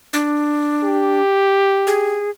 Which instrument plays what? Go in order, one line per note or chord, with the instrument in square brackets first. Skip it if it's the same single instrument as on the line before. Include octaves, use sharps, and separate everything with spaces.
[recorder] D4
[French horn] G4
[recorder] G#4